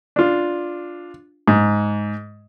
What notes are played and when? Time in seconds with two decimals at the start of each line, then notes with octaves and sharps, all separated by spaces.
0.16 D4 F4
1.48 G#2